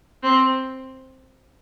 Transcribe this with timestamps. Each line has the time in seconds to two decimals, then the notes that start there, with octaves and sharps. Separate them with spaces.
0.23 C4